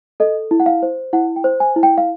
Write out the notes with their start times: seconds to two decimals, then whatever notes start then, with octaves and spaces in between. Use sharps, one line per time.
0.20 A4 D#5
0.51 E4
0.60 F#5
0.66 F5
0.83 C5
1.13 E4 F#5
1.36 G5
1.44 C5
1.60 G#5
1.76 E4
1.83 G5
1.98 F5